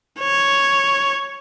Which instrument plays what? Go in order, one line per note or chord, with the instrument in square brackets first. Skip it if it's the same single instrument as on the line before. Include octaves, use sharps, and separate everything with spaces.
[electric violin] C#5